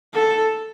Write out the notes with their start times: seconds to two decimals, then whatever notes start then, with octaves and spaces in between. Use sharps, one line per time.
0.14 A4